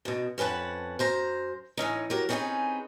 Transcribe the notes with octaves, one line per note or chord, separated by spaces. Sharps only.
F#2 B2
F2 C#4 B4 F#5 A5
F#2 C5 A#5
A2 E3 C#4 D#4
F#3 G4 A#4
C4 C#4 D#4 F4 G#4 B4